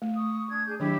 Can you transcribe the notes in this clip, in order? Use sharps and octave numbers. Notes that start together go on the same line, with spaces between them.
A3
C#6 D#6
D4 G#6
D4 G#4 G6
D#3 F#3 D4 E4 G4